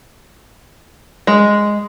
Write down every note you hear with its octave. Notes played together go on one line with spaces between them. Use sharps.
G#3